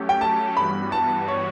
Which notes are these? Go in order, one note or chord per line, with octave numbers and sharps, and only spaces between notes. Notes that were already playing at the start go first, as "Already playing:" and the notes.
Already playing: F#3 A3 C#4 G4
G5
A5
G2 E3 G3 B3 F#4 B5
A5
C#5